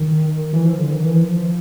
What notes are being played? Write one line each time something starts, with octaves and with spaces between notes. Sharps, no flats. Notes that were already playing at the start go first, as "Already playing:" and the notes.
Already playing: D#3
E3
F3
D3
D#3
E3
F3